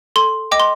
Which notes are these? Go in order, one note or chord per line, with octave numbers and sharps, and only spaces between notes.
A4 C6
D#5 G5 D6
C6